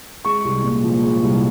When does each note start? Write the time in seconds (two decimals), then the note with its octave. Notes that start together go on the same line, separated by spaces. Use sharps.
0.25 G#3 C#6
0.45 C2
0.64 A#2
0.84 F3
1.03 G#3
1.23 C2